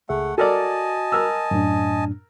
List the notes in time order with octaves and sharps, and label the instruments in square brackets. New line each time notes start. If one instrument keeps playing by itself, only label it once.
[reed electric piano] C#2 G#4 E5 [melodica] A3 F#5
[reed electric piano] F#4 [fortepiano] A4 A#4 D5 [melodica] D#5 G#5 A5
[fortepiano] A#4 E6
[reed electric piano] F#2 A2 D4